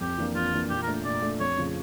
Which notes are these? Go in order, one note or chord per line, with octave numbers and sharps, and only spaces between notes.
F2 G4
E3 A#3 D4
F2 F4
E3 A#3 D4
A#2 G4
A#4
A3 D4
A#2 D5
A3 D4
F2 C#5
C#3 F3